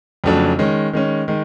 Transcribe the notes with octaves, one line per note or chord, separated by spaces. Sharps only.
F2 C#3 F#3 A3 D4
D#3 G#3 C#4
D#3 G#3 C#4
D#3 G#3